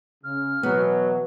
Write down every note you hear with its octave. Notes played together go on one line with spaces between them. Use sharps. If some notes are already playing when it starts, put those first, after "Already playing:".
C#3 F6
B2 E3 F#3 B3